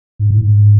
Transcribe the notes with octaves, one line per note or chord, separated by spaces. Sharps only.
G#2
A2
G#2